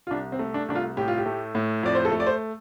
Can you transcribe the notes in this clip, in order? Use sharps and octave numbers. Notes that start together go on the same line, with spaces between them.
F4
C2 D4
C4
A3
D4
C2 D4
F4
A2 G4
F4
G4
A3
A2
F2 D5
C5
A4
A3
D5
C5